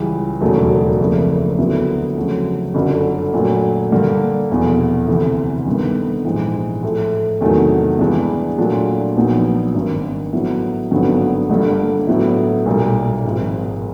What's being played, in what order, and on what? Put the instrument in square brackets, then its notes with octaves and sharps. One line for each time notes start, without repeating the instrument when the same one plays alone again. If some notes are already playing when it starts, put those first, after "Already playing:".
Already playing: [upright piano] C#2 C#3 E3 G3
E1 D#2 C#3 F#3 A3
F#1 F2 C#3 F3 A3
D2 D3 F#3 B3 E4
F2 C#3 F#3 A3 C#4
G1 F#2 D3 F#3
A#2 F#3 A3
G2 D3 G3 A#3
F1 E2 B2
D2 C3 E3
G2 D#3 G3 B3
A#1 G#2 E3
A2 F3 A3
E2 C3 D#3 F#3 A3
G2 E3 G#3 B3 D4
A#2 F#3 A3 D4 F4
A#1 A#2 F#3 B3 D#4
G#1 G2 D#3
A2 F#3 B3 E4
G#1 G2 D3 F#3 B3
G1 G2 D3 G3 A#3
A2 F#3 B3 E4
B1 A#2 G3 A#3
G#1 G#2 F3 G#3